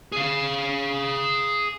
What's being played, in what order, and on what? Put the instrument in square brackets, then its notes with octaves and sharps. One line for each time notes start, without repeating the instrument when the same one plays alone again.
[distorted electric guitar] G#4 F5